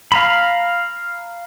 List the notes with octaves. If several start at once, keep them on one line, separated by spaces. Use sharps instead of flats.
F5 A#5 B5